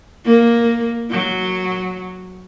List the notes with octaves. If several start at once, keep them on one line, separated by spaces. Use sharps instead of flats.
A#3
F#3